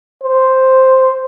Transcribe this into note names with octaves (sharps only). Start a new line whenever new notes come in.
C5